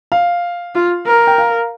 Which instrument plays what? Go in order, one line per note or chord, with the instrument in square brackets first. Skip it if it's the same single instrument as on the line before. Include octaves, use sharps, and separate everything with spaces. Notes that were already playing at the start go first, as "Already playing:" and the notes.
[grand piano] F5
[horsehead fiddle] F4
A#4
[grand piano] G5
F5